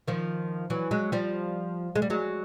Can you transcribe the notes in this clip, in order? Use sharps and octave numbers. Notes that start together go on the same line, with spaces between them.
D#3 F3
E3 F#3
F#3 G#3
F3 G3
G#3
G3
F#3 G#3